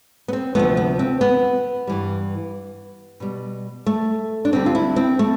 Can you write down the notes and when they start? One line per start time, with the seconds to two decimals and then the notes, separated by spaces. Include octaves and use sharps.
0.28 B3
0.33 C4
0.55 D2 C3 F3 A3 B3
0.77 B3
0.99 C4
1.21 B3
1.87 G2 E3 G3
3.20 B2 G3
3.86 A3
4.45 D4
4.52 D2 D3 G3 C4
4.66 F4
4.75 E4
4.96 C4
5.19 A3